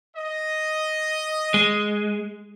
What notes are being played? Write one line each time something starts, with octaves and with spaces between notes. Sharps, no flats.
D#5
G#3